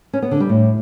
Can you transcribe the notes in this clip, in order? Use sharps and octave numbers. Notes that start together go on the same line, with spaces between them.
C#4
B3
D3
G3
A2